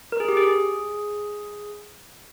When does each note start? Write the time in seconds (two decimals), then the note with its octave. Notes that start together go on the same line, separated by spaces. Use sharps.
0.12 A#4
0.20 G#4
0.28 G4
0.37 G#4
0.47 G#4